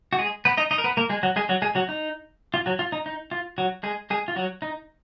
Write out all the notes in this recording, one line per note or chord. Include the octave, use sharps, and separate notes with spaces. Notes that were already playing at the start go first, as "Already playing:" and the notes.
F#4
G#3 G#4
B3 B4
D#4 D#5
D#4 D#5
A#4
B3 B4
A#3 A#4
G#3 G#4
F#3 F#4
G#3 G#4
F#3 F#4
G#3 G#4
F#3 F#4
D#4
F4
F#3 F#4
F4
D#4
D#4
F4
F#3 F#4
G#3 G#4
G#3 G#4
F4
F#3 F#4
D#4